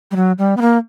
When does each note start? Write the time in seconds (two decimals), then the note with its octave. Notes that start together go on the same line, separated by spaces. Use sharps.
0.11 G3
0.16 F#3
0.38 G3
0.57 B3
0.61 A#3